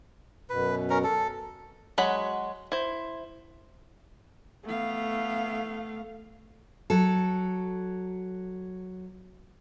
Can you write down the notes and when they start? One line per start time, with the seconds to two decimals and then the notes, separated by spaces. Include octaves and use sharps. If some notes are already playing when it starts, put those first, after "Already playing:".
0.50 F#2 B2 B4
0.90 C#4 A#4
1.04 A4
1.98 F#3 G#3 F#4 F#5 B5
2.72 E4 C5
4.65 A3 B3 F5
6.90 F#3 A4